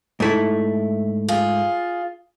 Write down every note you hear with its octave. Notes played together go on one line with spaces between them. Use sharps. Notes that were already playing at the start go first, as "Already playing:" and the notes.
G#2 A3 E4
F4 G#4